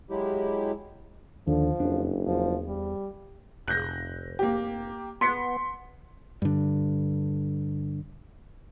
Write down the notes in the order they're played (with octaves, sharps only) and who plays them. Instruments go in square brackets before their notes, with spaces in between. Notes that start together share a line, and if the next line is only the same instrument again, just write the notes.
[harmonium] F#3 G#3 E4 G4
[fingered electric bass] D#2 [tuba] D3 [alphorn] F3
[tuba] F#1 [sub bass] F2 [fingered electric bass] D4
[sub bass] E2 [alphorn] F3
[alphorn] G3
[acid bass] F1 [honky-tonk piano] F#6 G6 A#6
[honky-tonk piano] A#3 G4
[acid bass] B3 [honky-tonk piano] C6 B6 C#7
[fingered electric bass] G2 D3